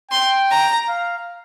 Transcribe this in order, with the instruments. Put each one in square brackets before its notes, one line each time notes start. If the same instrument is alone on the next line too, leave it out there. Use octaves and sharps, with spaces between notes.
[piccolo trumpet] G5 [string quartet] C6
[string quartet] A#5
[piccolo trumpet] F5